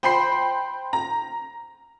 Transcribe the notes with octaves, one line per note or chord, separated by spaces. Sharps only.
C5 G5 B5 C6 C7
A#5